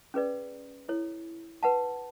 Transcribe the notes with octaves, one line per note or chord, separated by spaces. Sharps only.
C#4 G#4 B4 D5
E4 A4 C#5
B4 F#5 A5